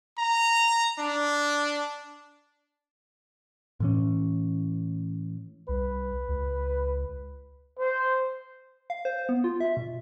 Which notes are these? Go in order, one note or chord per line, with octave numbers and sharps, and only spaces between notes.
A#5
D4
A2 E3 C#4
C2 B4
C#2
C5
F5
C5
B3
F4
E5
B2